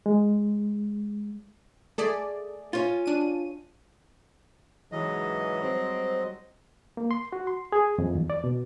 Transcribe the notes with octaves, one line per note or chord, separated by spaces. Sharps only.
G#3
A3 G#4 D5
C#4 F4
D4 D#7
G#2 C#3 E3 F#3 D#5
G3 G#3 C4
A#3
C6
F#4
C6
G#4
F2
E2
D5
B2